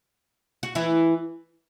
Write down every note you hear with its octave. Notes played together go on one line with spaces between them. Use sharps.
F#4
E3 E4